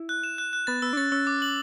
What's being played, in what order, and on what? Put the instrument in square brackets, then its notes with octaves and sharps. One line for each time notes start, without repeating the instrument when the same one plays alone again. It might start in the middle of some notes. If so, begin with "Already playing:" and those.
Already playing: [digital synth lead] E4
[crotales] F#6
E7
F#6
F#6
[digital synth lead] B3 [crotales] A6
[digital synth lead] B3 [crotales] E6
[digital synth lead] D4
[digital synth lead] C#4 [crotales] A6
[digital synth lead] C#4 [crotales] E6
[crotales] D6
F#7